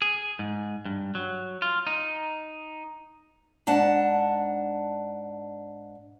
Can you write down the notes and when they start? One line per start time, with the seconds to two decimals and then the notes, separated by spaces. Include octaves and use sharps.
0.02 G#4
0.39 G#2
0.85 G2
1.15 F#3
1.62 F4
1.87 D#4
3.67 G#2 D4 F#5 A5